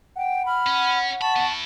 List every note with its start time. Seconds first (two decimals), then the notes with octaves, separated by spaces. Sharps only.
0.16 F#5 G5
0.46 B5 F6
0.67 C#4
1.22 A5 B5 C#6
1.36 B3 E4